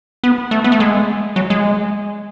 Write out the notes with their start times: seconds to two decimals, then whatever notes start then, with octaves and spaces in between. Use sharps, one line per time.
0.24 B3
0.51 A3
0.64 B3
0.72 A3
0.80 G#3
1.36 F#3
1.50 G#3